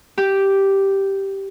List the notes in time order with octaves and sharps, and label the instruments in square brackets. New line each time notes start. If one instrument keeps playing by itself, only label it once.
[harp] G4